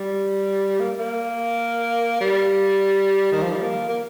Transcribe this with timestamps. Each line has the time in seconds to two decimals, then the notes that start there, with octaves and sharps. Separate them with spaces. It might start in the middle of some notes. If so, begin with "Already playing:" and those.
Already playing: G3
0.80 A#3
1.00 A#3
2.21 G3
3.32 D#3
3.43 F3
3.52 G3
3.62 A#3
3.88 A#3